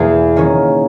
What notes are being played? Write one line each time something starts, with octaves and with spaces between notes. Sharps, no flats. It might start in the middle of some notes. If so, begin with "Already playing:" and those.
Already playing: E2 B2 A#3 G#4
D#3 A#3 C#4